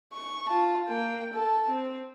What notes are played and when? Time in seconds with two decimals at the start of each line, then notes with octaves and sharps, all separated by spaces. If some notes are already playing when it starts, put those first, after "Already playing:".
0.13 C#6
0.49 F4 A5
0.88 A#3 G5
1.33 A4 A5
1.69 C4